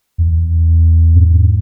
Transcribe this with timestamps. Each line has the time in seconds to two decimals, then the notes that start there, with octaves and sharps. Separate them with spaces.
0.18 E2
1.15 G#2